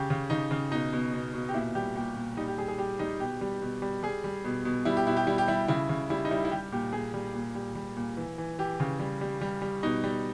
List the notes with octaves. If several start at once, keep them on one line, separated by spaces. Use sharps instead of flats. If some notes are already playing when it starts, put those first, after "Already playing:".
Already playing: C#3 G4
C#3
C#3 D#4
C#3
B2 D#4
B2
B2
B2
G4
A#2 E4
G3 G4
A#2 G4
A#2
G3 D#4
G4
G3 G#4
G#4
G3 G4
G3 D#4
B2 G4
G3
B2
G3
G3 G#4
G3
B2
B2
G3 E4
G4
B2 E4
G4
G3 E4
G4
G3 E4
C#3 E4
C#3
G3 E4
D#4
G3 E4
E4
G3 G4
A#2 G4
A#2 G#4
G3
A#2
G3
G3
A#2
E3
E3
E3 G4
C#3
G3
G3
G3
G3
B2 D#4
G3